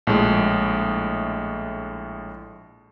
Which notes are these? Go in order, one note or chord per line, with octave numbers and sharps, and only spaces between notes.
A#1 A2 G#3